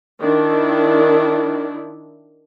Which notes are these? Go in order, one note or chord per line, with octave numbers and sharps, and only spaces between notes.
D#3 D4 E4